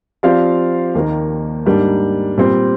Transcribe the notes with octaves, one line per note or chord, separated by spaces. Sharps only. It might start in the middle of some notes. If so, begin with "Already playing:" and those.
F3 C4 G4 D5 F5
D#2 D#3 A#3
G#2 G3 A#3 D4
A#2 G3 C4